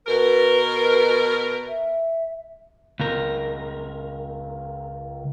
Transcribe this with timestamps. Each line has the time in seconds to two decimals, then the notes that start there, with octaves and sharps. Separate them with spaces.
0.06 B2 A#4 B4
1.68 E5
3.00 C#2 A#4